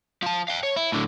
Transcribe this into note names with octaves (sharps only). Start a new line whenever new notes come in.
F3 A5
F5 G5
C#5
E4
A2 D3